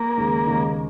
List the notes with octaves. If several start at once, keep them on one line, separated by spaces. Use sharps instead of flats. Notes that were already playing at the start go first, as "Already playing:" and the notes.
Already playing: A#3
D#2 C#3 G#3 D#4
D#2 C#3 G#3 D#4